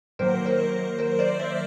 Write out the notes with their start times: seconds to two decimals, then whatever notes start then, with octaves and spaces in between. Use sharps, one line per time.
0.19 D#3 F#3 A#3 A#4 C5
0.46 A#4 C5
0.99 A#4 C5
1.19 C5 D5
1.40 D5 E5